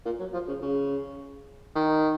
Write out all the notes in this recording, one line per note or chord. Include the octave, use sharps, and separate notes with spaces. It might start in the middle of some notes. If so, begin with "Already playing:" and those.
A#2
F#3
F3
C#3
C#3
D#3